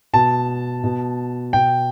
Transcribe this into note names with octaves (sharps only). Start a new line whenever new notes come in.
B2 A5
B2
B2 G5